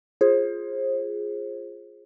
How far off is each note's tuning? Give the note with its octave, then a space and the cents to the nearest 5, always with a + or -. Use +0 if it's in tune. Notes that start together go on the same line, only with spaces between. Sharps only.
F4 +0 G#4 +0 C5 +30